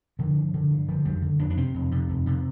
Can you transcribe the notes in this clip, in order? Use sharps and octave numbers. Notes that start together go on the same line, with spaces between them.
D3 F3
G2
D3
G2
D3 F3
F2 G3
D3
F2 D4
D4
C3 C4
F2
C3
F2
C3